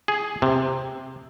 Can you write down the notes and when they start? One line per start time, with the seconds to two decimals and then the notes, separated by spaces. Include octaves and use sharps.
0.08 G#4
0.42 C3